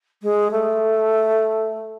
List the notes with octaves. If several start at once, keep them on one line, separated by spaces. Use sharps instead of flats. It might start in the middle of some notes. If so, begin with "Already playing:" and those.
G#3
A3